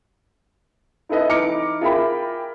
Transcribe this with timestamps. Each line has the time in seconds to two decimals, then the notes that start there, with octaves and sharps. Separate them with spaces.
1.09 D#4 E4 A4 B4 D#5
1.30 E3 D#4 A#5 D6 F6 C#7
1.81 F4 G#4 A#4 E5 G5 B5